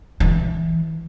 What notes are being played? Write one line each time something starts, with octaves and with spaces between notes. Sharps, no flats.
E3